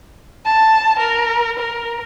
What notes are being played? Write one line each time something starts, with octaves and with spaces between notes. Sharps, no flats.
A5
A#4
A#4